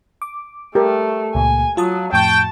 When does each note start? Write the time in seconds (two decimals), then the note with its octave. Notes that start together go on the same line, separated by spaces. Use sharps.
0.22 D6
0.75 A3 G4 A#4
1.35 C#2 A#2 G#5
1.77 F#3 F4 A5 D#6
2.13 F2 A2 G5 A5 C#6